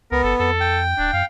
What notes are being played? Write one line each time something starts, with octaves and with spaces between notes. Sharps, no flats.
C#2 B3 A#4
G1 A4
F2 A4
G5
D1 D4
F#2 F5